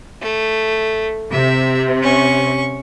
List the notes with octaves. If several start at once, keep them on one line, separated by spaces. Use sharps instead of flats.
A3
C3 E5
C#4 C#6